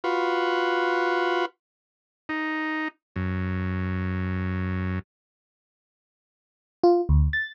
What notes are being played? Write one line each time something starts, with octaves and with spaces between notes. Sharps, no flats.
F4 F#4 B4
D#4
F#2
F4
D2
A6